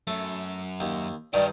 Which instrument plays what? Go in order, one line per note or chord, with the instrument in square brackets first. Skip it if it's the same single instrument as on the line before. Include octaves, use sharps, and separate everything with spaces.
[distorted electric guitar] F#2 [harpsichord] A3
[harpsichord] D#2
[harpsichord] G2 D#3 [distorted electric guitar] G4 A#4 [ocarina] D5